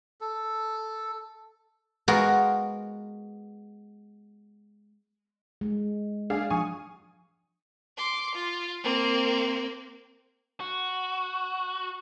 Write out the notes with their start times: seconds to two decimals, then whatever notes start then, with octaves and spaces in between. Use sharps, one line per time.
0.21 A4
2.08 G#3 B3 F4 F#4 A#4
5.61 G#3
6.30 D4 G#4 F5
6.50 F3 D4 G#5 C#6 D#6
7.97 C6 D6
8.35 F4
8.82 A#3 C4
10.60 F#4